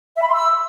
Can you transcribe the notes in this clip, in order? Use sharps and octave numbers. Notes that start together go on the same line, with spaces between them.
E5
B5
C6
E6